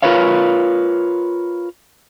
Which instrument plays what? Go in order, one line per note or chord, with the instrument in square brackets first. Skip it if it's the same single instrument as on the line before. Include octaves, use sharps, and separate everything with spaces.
[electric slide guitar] F4 A#4 B4 C#5 F5